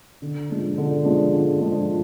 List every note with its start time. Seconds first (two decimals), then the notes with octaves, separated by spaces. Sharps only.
0.22 D3
0.50 F3 G#3 D4
0.77 D3
1.05 F3 G#3 D4
1.33 D3
1.61 F3 G#3 D4